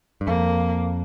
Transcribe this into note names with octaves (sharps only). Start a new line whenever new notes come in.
G2
F2 A#3